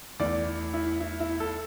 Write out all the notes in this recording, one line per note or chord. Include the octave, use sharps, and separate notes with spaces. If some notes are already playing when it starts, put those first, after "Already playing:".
E2 E3 A3 D5
E4
E4
E4
A4